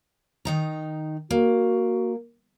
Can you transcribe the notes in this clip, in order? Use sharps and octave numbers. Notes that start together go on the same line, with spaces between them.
D#3 D#4 A#5
A#3 F#4